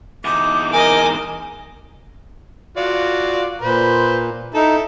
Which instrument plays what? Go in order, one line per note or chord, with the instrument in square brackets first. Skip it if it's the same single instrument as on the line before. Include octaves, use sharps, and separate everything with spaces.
[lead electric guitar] E2 D#4 [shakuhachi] D6
[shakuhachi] A#4 [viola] D#5 D6 [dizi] G#5
[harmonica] F4 F#4 D5
[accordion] A#2 [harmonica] B4 C5
[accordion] D#4 [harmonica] E4 A4